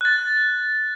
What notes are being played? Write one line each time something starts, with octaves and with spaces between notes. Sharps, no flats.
F#6 A6